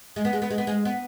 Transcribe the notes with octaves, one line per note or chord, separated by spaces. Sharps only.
G#3
B3
G#3
B3
G#3
B3
G#3
B3